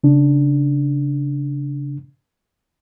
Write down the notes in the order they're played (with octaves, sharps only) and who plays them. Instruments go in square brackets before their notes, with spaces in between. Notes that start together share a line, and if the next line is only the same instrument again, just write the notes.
[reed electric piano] C#3 D4